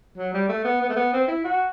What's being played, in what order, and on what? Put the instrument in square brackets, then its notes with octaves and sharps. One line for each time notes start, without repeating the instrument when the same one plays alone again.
[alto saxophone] F#3
G3
A3
B3
B3
A3
B3
C4
E4
F#4